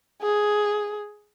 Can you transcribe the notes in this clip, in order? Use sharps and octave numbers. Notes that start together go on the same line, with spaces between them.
G#4